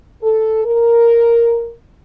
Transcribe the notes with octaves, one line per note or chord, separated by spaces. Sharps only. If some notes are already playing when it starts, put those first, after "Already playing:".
A4
A#4